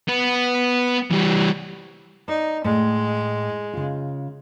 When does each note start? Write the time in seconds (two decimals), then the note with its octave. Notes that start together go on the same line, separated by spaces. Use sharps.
0.08 B3
1.11 E3 G3
2.28 D#4 D5
2.64 A2 G#3
3.73 C#3 F4